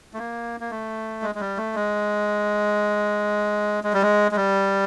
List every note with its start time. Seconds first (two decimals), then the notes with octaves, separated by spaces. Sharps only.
0.13 A3
0.18 A#3
0.60 A#3
0.71 A3
1.22 G#3
1.35 G#3
1.40 G3
1.57 A3
1.75 G#3
3.84 G#3
3.93 G3
4.02 G#3
4.32 G#3
4.36 G3